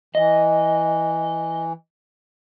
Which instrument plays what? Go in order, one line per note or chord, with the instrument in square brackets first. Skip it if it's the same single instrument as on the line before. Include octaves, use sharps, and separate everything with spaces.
[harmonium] E3 [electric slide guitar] D#5